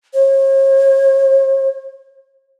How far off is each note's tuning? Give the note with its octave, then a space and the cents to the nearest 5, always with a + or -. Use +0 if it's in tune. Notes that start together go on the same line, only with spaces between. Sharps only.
C#5 -45